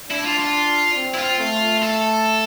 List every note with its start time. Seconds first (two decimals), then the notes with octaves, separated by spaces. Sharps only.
0.10 D4 E4
0.25 F4
0.39 F4
0.97 C4
1.14 E4
1.18 F4
1.39 A3
1.82 A4